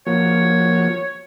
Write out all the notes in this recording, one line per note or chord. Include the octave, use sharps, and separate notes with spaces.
F3 A#3 F#4 C#5